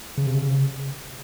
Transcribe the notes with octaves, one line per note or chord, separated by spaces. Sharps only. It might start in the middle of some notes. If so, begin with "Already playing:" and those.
C#3
C3
C#3